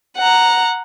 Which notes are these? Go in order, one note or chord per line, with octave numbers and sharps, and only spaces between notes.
F#5 A#5